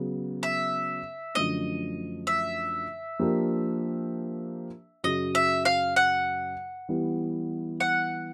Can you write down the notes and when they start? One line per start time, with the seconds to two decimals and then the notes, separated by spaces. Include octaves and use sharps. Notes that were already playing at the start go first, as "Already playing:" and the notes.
Already playing: C#3 F#3 B3
0.43 E5
1.35 F#2 D3 F3 A3 D4 D#5
2.27 E5
3.19 F3 A#3 D4 G4 A#4
5.04 F#2 C#3 F#3 D#5
5.35 E5
5.65 F5
5.96 F#5
6.89 E3 G3 B3 E4
7.80 F#5